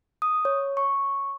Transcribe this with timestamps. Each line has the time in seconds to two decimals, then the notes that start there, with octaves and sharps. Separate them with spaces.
0.22 D#6
0.45 C#5
0.77 C#6